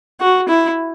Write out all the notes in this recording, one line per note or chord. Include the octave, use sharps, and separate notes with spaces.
F#4
E4